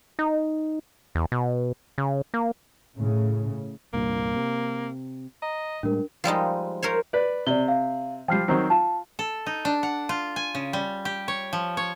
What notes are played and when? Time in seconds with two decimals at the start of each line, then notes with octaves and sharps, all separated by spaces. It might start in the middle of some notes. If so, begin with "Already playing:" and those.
0.19 D#4
1.15 E2
1.32 B2
1.98 C#3
2.34 A#3
2.97 A2 C#3
3.94 C2 G2 A#2 A#3
4.36 C3
5.42 D#5 A#5
5.83 A2 G3 G#3 D4 A#4
6.24 F3 G3 G#3 D#4
6.83 A#4 C5 C#5
7.13 B4 D5
7.47 C3 D5 G7
7.68 F5
8.28 F3 G3 G5 F6 C7
8.48 D#3 F#3 C4
8.70 F4 A5
9.19 A4
9.46 D#4
9.65 D4
9.83 F#5
10.09 F4
10.36 G#5
10.55 C#3
10.73 G3
11.05 G4
11.28 C#5
11.53 F3
11.77 C#5